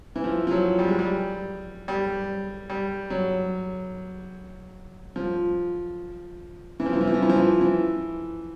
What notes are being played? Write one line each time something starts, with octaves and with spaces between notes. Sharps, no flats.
E3
F3
F3
F#3
G3
G#3
G3
G3
G3
F#3
F3
E3
F3
E3
F3
E3
F3
E3
F3
E3
E3